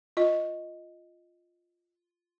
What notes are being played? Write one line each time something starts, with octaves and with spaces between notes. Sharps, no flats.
F4 D#5